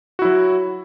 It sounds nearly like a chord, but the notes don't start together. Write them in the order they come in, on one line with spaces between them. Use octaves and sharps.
F#4 E4 F#3